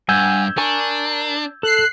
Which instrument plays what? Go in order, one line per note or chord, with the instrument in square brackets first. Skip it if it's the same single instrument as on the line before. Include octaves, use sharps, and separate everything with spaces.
[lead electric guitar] G2 [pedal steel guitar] F#5 G#5 [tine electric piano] E6 G6 G#6
[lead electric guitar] D4 [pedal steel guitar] A#4 G#5 C#6
[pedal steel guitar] A4 [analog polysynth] F#6 C7